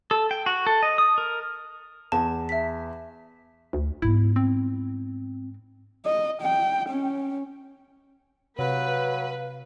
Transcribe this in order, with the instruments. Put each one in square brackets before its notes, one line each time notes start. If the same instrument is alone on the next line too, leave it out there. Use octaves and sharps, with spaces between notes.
[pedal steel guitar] A4
G5
F#4
A4
D#5
D#6
A#4
[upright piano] E2 [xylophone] A5
[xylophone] E5 B6
[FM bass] D2
[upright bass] G#2 B3 [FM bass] E4
[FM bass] C4
[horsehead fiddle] D#5
G5
C#4
[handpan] C3 [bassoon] F#3 [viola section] B4 [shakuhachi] F5